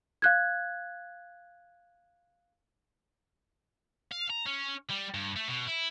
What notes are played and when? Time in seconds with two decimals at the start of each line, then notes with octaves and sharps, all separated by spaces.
0.22 F5 F#6 G#6
4.11 F5
4.30 A#5
4.46 C#4
4.90 G3
5.14 G2
5.36 A3
5.48 B2
5.67 E4